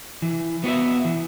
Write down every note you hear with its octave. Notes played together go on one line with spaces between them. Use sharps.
E3
B3 F#4 B4 E5
E3